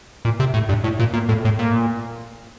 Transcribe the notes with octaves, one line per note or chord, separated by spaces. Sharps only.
A#2
C3
A2
G2
A2
A#2
A#2
A2
A2
A#2